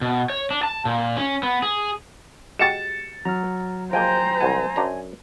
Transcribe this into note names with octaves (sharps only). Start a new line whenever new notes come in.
B2
C#5
D4
A5
A#2
C#4
B3
G#4
G#3 F#4 G4 A6 C#7 E7
F#3 A#5 F6
F3 G#3 A#3 C5 G5 G#5 A#5 G6
C2 E3 F#5 G#5
F#2 D4 A#5